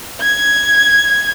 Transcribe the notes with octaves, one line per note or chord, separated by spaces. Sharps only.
G#6